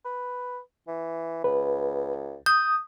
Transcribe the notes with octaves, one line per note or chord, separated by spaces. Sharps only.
B4
E3
C#2 B4
D#6 G6